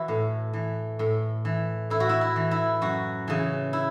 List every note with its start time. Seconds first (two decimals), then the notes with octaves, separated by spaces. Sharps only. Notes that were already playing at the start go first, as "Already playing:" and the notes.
Already playing: E3 E4 F#4
0.08 A2
0.53 E3
0.99 A2
1.45 E3
1.90 A2 E4
2.00 F#4
2.09 E4
2.21 E4
2.36 E3
2.51 E4
2.82 F#2 F#4
3.28 C#3 E3
3.73 E4